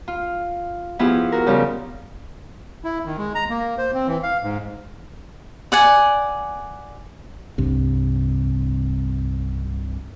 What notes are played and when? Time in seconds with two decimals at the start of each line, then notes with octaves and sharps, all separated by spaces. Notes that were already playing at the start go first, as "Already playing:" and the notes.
0.08 F4
0.99 F3 B3 E4 F4 G4 G#4
1.32 F#4 A#4
1.46 C#3 F3 G3 G4
2.84 E4
3.05 D#3
3.17 G#3
3.35 A#5
3.50 A#3
3.78 C5
3.94 C4
4.07 E3
4.23 F5
4.43 G#2
5.72 D5 F#5 G#5
7.58 C2 G2 C3